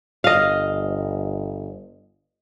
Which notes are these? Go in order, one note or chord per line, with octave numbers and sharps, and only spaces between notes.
G1 D#5 F5